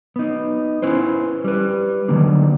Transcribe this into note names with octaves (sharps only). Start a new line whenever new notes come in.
B3 D#4
C#4 E4 B4 C5
G3 B4
D3 D#3 F#3 A#3 D4